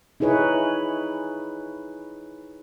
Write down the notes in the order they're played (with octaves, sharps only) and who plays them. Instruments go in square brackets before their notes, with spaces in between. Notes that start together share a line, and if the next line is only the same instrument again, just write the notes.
[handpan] D#4 E4 G#4 B4 C#5